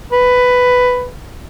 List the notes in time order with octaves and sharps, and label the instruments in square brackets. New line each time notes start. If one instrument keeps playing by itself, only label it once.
[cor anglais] B4